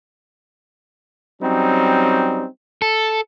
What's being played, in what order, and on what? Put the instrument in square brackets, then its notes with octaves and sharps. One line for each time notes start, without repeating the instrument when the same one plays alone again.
[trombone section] F#3 G3 C4 C#4 D#4
[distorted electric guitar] A4